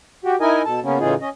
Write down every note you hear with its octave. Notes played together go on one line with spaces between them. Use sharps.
F#4 G4
D#4 E4 A#4 D#5 G#5
B2 A4 A5
C#3 A#3 B3 C#4
A2 C#3 E3 D#4 F4 G#4
C#4 D#5